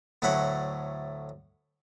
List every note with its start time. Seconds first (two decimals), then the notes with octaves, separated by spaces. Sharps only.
0.22 D2 A2 F#3 A3 F#5 B5